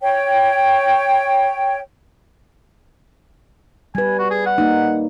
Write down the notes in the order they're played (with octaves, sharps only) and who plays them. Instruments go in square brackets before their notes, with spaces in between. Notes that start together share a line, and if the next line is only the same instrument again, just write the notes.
[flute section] C#5 G5
[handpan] G3 B4 [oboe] G#5
[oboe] F#4
G#4
F#5
[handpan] A#3 D#4